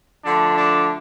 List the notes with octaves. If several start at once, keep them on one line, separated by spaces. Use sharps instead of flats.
D3 F3 A3 D4
D4